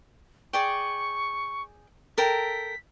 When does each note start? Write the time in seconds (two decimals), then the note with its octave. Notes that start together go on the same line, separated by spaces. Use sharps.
0.53 G#4 D5 G5 C#6
2.18 A4 A#4 G5 B6